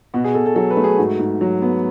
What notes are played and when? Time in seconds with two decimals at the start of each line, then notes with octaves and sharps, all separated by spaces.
0.14 B2 F#4
0.24 G#4
0.35 B2 A4
0.46 A4
0.56 F#3 A4
0.70 B4
0.77 A3
0.84 G#4
0.98 G#2 F#4
1.19 G#2
1.41 F#3
1.62 B3